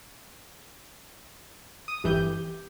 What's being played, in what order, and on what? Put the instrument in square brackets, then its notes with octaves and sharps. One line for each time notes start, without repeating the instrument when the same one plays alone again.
[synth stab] D#6
[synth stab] G1 E3 G6 [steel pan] G4